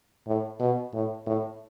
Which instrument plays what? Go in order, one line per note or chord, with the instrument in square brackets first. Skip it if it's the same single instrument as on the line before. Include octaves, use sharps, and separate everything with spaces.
[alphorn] A2
B2
A2
A2